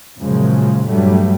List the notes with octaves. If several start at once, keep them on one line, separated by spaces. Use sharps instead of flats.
F#2 A#2 C#3 F3 G#3
G2 F#3 G3 A3